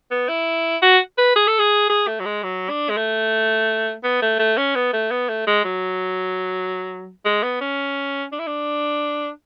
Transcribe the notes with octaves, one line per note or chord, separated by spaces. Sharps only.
B3
E4
F#4
B4
G#4
A4
G#4
G#4
A3
F#3
G#3
F#3
D4
G#3
A3
B3
A3
A3
C#4
B3
A3
B3
A3
G#3
F#3
G#3
B3
C#4
D4
E4
D4